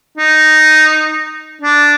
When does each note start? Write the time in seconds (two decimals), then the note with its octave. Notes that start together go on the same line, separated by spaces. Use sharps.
0.18 D#4
1.62 D4